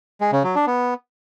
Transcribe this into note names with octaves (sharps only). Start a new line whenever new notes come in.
G#3
C#3
F#3
D4
B3